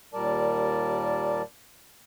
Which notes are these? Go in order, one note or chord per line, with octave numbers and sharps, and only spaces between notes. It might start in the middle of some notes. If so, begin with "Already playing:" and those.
D#2 A#2 G3 A#4 D5 A5